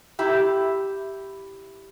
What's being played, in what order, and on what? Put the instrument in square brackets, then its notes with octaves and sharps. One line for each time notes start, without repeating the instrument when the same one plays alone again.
[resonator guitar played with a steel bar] E4 G4